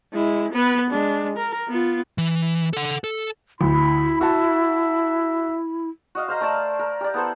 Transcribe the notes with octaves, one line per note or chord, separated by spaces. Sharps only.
G#3 E4
B3 B4
G#3 D4
A#4
B3 F4
E3
A4 F#5
A4
D2 E4 B5
F#4 E5 A5
F#4 D#5 F5
C5 F5 A#5
A3 A#4 D5 A5
A#4
G4 D5
B3 E4 A4 C5